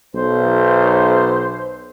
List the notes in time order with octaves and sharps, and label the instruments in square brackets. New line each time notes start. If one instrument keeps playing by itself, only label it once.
[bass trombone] B1 [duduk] C5